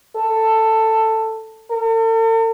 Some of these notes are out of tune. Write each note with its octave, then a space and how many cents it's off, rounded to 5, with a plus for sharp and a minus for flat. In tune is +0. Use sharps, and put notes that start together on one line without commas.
A4 +10
A4 +45